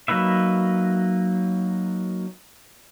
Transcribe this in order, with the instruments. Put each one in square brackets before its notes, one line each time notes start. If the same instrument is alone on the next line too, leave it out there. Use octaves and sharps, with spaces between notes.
[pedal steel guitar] F#3 A#3 D#4 B4 E5